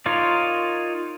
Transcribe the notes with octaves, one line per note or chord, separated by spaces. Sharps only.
D#4 F4 A#4 C#5 D5